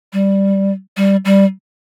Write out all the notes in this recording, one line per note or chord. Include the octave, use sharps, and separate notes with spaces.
G3
G3
G3